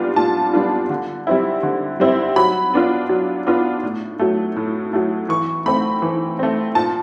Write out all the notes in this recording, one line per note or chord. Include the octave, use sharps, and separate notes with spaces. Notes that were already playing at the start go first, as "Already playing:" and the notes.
Already playing: A#2 G3 B3 D4 F4
A#2 A5
G3 B3 D4 F4
D3
G3 C4 E4
D3
G3 C4 E4
F#3 B5
B3 D4 F4
F#3
B3 D4 F4
A2
F#3 A3
A2
F#3 A3
E3 C#6
A3 C4 B5
E3
A3 C4
A#2 A5